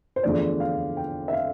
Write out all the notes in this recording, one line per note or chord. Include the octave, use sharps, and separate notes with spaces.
C5
E2 D3 F3 A3 D5
F5
G5
E5
F5